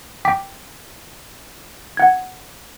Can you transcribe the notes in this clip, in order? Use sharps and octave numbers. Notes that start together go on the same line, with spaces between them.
G5 D6 B6
F#5 G#6